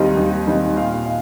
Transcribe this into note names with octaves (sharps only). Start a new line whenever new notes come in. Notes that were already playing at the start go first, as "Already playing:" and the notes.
Already playing: D#2 D#3 G3 C4 D#4
D#2
D#3 G3 C4 D#4
A#2 F5
D#4 F5